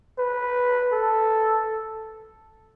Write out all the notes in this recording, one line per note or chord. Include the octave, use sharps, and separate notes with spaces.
B4
A4